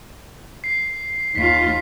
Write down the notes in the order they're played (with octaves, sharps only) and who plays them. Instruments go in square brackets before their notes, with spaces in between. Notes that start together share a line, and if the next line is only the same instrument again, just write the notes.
[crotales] C7
[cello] D#2 F4 [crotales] B6 C7